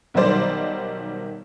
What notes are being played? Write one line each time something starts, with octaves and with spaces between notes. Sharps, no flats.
B1 D#3 F#3 G3 C5 D5